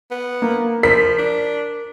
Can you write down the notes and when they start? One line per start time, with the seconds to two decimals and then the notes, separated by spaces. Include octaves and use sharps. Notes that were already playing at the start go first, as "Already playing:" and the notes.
0.11 B3
0.42 A#3
0.83 F3 A#4 B6
1.18 D4